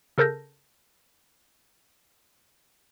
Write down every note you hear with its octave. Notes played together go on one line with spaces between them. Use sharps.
C#3 A4 A#4 A5 G6 A#6